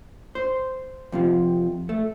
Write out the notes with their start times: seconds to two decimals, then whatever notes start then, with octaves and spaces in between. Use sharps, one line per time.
0.35 C5
1.12 F2 C3 F3
1.89 A3